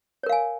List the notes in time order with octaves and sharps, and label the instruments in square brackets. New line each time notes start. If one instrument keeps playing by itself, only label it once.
[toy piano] C#5
A#4
F5
G#5